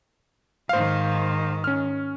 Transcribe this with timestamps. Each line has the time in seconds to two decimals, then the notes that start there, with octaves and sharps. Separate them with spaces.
0.69 G#2 D#3 C5 F5
1.64 C#4 F6